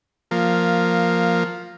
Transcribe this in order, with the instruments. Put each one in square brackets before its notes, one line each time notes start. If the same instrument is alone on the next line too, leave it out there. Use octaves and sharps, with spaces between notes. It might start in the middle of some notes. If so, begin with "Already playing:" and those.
[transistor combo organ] F3 A#3